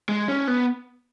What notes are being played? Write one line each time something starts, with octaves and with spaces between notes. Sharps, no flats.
G#3
C#4
B3